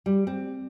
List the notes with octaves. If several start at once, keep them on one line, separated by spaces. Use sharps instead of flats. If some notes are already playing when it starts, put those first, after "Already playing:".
G3
C4